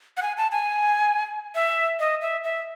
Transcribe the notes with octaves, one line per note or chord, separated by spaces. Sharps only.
F#5
G#5
A5
G#5
E5
D#5
E5
E5